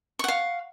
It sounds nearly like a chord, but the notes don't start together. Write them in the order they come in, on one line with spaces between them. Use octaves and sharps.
C#6 F#5 F5